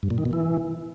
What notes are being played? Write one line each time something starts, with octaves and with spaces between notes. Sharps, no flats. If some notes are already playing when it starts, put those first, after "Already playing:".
G2
A#2
D#3
B2
E3